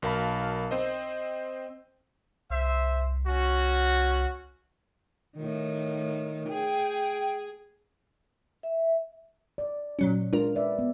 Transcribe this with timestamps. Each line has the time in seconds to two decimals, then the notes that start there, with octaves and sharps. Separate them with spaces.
0.02 B1 A#4 F5 A5 B5
0.71 C4 C5 D#5
2.50 C2 C5 E5
3.27 C#4 F#4
5.37 A2 D#3
6.49 G#4 G5
8.63 E5
9.58 D5
9.99 A#2 F#3 C#4
10.33 G#3 D4 F4 A#4
10.55 B4 D5 E5
10.79 B3